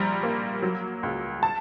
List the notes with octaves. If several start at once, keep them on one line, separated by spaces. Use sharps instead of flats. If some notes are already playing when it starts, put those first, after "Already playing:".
Already playing: A#1 G3 A#5
A#3
F#3
C#2
A5